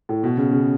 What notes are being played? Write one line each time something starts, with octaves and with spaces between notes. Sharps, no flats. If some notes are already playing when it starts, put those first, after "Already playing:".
A2
B2
C#3
C#3